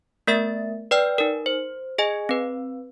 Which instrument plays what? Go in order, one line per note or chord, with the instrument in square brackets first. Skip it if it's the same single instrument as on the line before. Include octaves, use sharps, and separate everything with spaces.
[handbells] A3 B3 A#4 E5 A6
B4 D5 G5 F6
D#4 A#4
C5
G#4 D#5 G#5
C4 B4